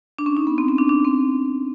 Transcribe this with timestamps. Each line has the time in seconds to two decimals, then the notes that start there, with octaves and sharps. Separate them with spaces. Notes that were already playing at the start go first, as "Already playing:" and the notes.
0.19 D4
0.26 C#4
0.37 D#4
0.47 B3
0.58 C4
0.69 C#4
0.78 D4
0.89 D4
1.05 C4